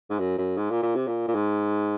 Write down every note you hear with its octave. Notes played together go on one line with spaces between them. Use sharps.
G#2
F#2
F#2
G#2
A#2
A#2
C3
A#2
A#2
G#2